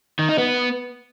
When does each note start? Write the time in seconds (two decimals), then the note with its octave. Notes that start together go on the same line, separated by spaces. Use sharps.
0.19 D#3
0.29 D#4
0.38 B3